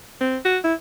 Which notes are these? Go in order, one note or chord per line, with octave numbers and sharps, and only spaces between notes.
C4
F#4
E4